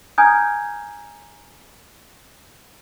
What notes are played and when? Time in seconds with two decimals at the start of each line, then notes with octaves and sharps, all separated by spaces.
0.18 G#5 A#5 D#6 F6 G6 G#6